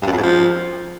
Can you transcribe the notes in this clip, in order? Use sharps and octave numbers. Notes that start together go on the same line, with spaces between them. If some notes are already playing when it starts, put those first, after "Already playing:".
G2
F#2
F2
G#2
F3